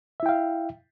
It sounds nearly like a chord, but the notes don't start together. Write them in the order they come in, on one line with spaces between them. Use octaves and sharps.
E5 E4 G5 F5